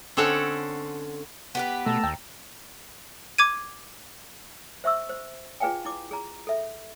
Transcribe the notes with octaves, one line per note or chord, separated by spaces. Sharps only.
D3 C4 C#4 A4 C#5 F#5
B3 G4 B4
B2 A3 A5 A#5 E6
D#2 G5
D6 G#6 D#7
C5 E5 C#6 E6
C5
F4 G#4 B4 F5 G5 G#5
E4 D6
G#4 A#5
A4 E5